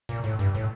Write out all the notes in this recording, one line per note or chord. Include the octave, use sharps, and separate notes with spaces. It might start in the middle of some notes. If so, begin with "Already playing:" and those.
A#2
A2
G2
A2